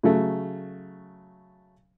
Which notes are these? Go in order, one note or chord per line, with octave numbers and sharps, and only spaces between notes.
C#3 F#3 A3